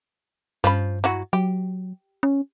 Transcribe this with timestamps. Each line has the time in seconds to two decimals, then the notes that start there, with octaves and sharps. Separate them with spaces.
0.64 G2 F3 C#4 B5
1.04 F#3 E4 F#4
1.33 F#3 G4
2.23 C#4